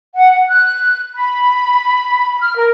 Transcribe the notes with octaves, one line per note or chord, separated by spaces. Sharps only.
F#5
F#6
B5
F6
A#4